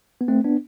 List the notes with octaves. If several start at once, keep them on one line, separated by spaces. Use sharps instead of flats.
B3
A3 C4
B3 D4